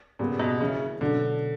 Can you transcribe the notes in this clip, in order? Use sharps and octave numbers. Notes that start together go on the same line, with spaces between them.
A#2 C#3 G3 B3
B2
C#3 E3 A#3 C#4 E4
B2 D3 F#3 B3 D4